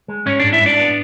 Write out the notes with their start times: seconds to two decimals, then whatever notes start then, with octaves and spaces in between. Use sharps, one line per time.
0.08 G#3
0.26 G#2 C#4 C#5
0.39 G#2 D4 D5
0.52 E4 E5
0.61 G#2 D4 D5
0.79 B3